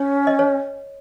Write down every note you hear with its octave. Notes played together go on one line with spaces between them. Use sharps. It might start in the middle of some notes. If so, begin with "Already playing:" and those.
Already playing: C#4 C#5
D#5
C#5